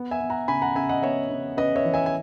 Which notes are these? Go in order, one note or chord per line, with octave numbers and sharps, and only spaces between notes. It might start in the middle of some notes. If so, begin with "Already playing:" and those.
Already playing: B3
E5 G#5
B3
F#5 A#5
C#3 G#5 B5
F#5 A#5
C#3 E5 G#5
D#5 F#5
B3 C#5 E5
C#3
C#3 B4 D#5
C#5 E5
E3
E5 G#5
G#5